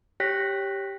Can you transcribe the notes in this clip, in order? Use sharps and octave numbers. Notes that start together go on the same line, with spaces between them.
G4 C#5 G5 F#6 A#6 B6